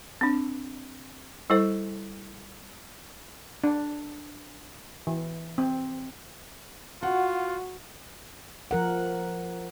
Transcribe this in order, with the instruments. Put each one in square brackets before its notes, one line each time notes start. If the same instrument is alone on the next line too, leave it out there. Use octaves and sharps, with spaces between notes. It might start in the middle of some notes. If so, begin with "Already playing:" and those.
[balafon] C4 D4
G3 E4 A4 C5
[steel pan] D4
E3
C4
[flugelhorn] F4 [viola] F#4 [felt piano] F#5
[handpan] F3 A#4 F#5